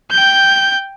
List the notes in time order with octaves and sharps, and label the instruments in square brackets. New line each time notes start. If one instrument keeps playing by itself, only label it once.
[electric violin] G5 G6